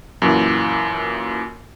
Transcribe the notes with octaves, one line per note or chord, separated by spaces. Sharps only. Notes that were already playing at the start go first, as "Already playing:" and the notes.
F#2 A#2 E3